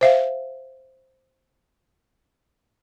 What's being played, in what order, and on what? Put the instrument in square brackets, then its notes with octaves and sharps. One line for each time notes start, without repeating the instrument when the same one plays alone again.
[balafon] C5 E5 F5